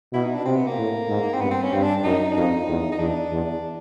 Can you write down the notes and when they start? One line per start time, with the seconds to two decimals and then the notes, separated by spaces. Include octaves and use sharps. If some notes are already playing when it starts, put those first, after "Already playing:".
0.13 B2 E4
0.24 D#4
0.35 D4
0.45 C3 C4
0.56 B3
0.67 A#3
0.77 A2
1.09 G#2
1.34 C4
1.41 G2 B3
1.51 C4
1.63 C#4
1.73 G2 C4
1.83 D4
2.04 F#2 D#4
2.32 D4
2.36 F2 D#4
2.69 E2
2.92 D#4
3.00 E2 D4
3.32 E2